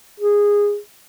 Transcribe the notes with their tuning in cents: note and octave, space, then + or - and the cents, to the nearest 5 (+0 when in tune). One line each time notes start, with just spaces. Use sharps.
G#4 -15